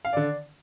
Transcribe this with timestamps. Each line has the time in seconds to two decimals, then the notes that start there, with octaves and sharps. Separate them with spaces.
0.05 F5
0.13 D3 D5